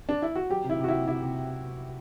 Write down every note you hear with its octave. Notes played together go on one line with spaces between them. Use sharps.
D4
E4
F#4
F#3 G4
C3
E4
C3 F#4
E4
C3
C3 E4
C3